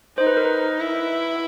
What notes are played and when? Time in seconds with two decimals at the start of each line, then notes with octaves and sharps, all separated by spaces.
0.18 D#4 C5
0.27 B4
0.37 A#4
0.45 B4
0.80 E4